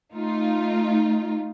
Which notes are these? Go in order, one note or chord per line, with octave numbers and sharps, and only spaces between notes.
A3 D#4 F4